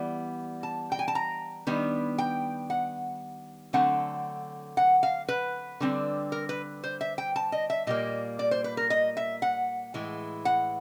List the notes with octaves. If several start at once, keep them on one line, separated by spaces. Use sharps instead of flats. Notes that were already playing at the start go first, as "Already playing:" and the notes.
Already playing: E3 G3 B3
A5
G5
G#5
A5
A#5
D#3 G3 B3 D4
G5
F#5
D3 F#3 A3 C4 F#5
F#5
F5
B4
D3 G3 C4
A#4
B4
C5
E5
G5
A5
D#5
E5
A#2 G3 A#3 D#5
D5
C5
B4
A#4
D#5
E5
F#5
A2 E3 G#3
F#5